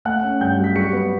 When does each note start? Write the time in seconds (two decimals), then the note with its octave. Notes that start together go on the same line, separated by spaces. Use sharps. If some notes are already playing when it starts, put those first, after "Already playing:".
0.05 A3 F#5 F#6
0.23 C#4
0.41 G2 G5 G6
0.58 F#3
0.64 B6
0.76 G3 C#6 C#7
0.93 B3